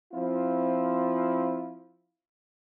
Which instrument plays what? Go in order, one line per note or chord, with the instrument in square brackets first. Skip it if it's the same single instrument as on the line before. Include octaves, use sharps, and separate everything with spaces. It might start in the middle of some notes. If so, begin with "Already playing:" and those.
[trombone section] F3 C4 E4 F4